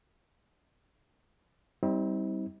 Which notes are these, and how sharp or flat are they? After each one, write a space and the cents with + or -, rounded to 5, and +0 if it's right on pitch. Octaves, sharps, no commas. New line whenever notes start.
G3 +0 C4 +0 D#4 +45